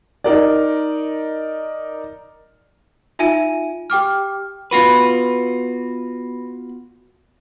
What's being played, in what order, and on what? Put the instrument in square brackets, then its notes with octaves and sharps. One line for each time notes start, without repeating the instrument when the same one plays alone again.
[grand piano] D#4 A#4 D5
[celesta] D#4 F4 E5 G#5 D#7
G4 G5 D6 F6
[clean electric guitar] B3 F4 F#4 B4